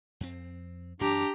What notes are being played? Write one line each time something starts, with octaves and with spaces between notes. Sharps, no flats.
F2 C4
F#2 E3 D4 G4 A#5